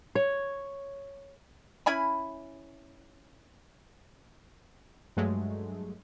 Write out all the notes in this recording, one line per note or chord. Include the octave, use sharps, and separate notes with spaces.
C#5
C#4 E4 G#5 B5
G2 F#3 G#3 A3